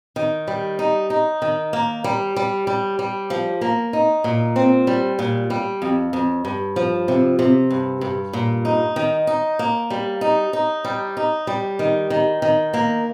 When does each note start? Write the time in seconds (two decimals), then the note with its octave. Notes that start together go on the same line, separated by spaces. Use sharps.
0.16 D#3
0.48 G3
0.79 D#4
1.10 D#4
1.42 D#3
1.73 A#3
2.04 G3
2.36 G3
2.67 G3
2.99 G3
3.30 F3
3.61 A#3
3.93 D#4
4.24 A#2
4.56 C4
4.87 G3
5.19 A#2
5.50 G3
5.82 F2
6.13 F2
6.45 G2
6.76 F3
7.08 C3
7.39 C3
7.71 G2
8.01 G2
8.33 A#2
8.65 D#4
8.96 D#3
9.27 D#4
9.59 A#3
9.90 G3
10.21 D#4
10.53 D#4
10.85 G3
11.17 D#4
11.47 G3
11.79 D#3
12.10 D#3
12.42 D#3
12.74 A#3